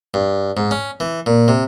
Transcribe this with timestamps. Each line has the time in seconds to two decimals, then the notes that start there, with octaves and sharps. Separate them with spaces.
0.14 G2
0.57 G#2
0.71 C#4
1.00 E3
1.26 A#2
1.48 C3